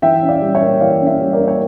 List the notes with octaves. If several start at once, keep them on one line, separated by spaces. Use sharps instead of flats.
E3 E5 G5
C#4
D5 F5
G3
C#5 E5
A#3
E3 D5 F5
C#4
C#5 E5
G3
A#4 D5
A#3
C#5